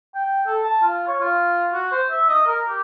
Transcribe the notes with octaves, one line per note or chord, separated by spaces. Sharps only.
G5
A4
A5
F4
C#5
F4
F#4
C5
E5
D#5
A#4
G4